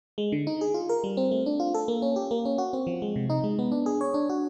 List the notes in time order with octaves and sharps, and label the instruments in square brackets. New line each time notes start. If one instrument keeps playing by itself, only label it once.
[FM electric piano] G#3
D3
D#4
G#4
F4
A#4
G3
C4
A3
D4
F4
A4
A#3
C#4
G4
A#3
C#4
F#4
C4
F3
G#3
C3
D#4
G#3
B3
D4
G#4
C#5
D4
F#4